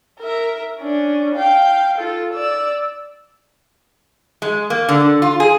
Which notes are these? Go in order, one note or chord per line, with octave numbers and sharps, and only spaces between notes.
A#4 E5
C#4 D4
F5 G5
F4 A4
D5 E6
G#3
A#3
D3
F4
G#4